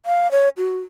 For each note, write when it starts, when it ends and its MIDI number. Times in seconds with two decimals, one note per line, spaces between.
0.06 0.30 77
0.31 0.49 73
0.57 0.78 66